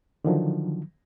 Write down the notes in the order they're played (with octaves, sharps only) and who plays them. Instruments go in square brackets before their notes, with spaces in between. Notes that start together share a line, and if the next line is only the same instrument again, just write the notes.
[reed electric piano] D3 D#3 F3 F#3